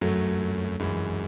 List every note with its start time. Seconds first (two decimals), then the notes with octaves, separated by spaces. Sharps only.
0.01 F#2 F#3 A3
0.80 F#2 E3 G#3